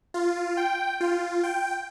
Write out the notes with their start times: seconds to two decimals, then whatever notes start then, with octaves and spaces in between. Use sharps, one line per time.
0.14 F4
0.57 G5
1.01 F4
1.43 G5